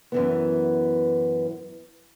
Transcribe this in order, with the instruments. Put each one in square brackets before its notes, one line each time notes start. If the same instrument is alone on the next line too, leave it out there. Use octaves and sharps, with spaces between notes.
[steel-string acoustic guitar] F#2 E3 B3